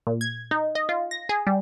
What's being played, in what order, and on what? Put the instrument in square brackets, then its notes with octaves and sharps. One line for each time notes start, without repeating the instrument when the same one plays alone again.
[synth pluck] A#2
G#6
D#4
D#5
F4
A#6
G#4
G3